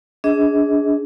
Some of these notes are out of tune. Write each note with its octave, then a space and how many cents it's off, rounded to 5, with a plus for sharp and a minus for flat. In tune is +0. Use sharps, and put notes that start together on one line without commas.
D4 -25 G#4 +0 D#5 +40